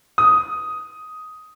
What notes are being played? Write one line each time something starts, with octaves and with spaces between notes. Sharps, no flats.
D#6